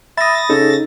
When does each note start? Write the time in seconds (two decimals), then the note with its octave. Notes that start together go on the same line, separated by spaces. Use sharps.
0.18 E5 B5 D#6 A6 A#6
0.50 C#3 D#4 A4